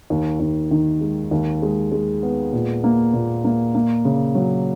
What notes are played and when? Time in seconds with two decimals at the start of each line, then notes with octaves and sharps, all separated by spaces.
0.10 D#2
0.40 D#2
0.71 D#3
1.01 G#3
1.31 D#2
1.62 G#3
1.92 G#3
2.23 B3
2.53 A#2
2.84 A#3
3.13 A#2
3.44 A#3
3.75 A#3
4.05 C#3
4.35 F#3